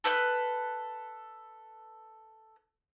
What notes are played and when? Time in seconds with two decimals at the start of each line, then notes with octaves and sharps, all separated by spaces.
0.04 A4 B4 F6 G6